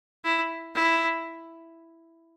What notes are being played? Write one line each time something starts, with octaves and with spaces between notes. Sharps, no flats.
E4
E4